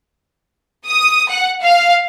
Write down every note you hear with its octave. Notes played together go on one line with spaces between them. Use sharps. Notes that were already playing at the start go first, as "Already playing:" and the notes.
D#6
F#5
F5